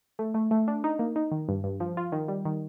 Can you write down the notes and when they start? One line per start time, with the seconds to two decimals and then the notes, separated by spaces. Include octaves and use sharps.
0.19 A3
0.34 A3
0.51 A3
0.68 D4
0.84 D#4
0.99 A#3
1.16 D#4
1.31 D#3
1.49 G2
1.64 G2
1.80 F3
1.97 F4
2.12 D#3
2.28 G3
2.45 D#3